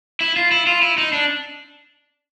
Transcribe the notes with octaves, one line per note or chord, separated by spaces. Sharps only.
E4
F4
E4
F4
E4
D#4
D4